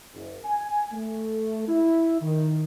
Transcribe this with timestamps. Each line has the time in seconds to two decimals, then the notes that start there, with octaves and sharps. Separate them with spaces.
0.14 F#1
0.44 G#5
0.92 A3
1.68 E4
2.20 D#3